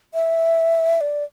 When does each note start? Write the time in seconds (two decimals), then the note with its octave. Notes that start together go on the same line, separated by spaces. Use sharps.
0.14 E5
1.01 D5